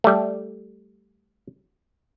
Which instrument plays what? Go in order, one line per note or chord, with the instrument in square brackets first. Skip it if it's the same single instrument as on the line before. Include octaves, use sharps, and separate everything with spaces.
[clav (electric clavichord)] G3 A3